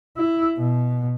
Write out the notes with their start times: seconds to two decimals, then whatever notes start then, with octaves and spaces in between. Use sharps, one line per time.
0.17 E4
0.58 B2